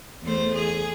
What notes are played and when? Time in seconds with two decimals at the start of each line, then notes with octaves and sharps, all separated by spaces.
0.22 E2 A3 C5
0.55 G#4